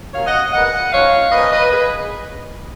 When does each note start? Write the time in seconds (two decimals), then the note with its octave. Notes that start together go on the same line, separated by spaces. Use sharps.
0.14 D#2 D#3 F#3 A#3 C#4 C#5 F5
0.26 D#5 F#5
0.53 A#2 G#3 B3 D#5 F#5
0.93 G#2 F3 G#3 C#4 C#5 F5
1.32 A#2 F3 A#3 B4 D#5
1.52 B4 D#5
1.71 G#4 B4